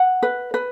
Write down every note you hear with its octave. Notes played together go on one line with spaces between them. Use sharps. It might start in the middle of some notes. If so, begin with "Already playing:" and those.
Already playing: F#5
B4
B4